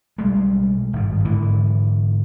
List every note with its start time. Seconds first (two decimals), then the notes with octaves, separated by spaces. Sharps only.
0.18 B1 G3 G#3
0.93 G#1 G2
1.25 G#2 D3 E3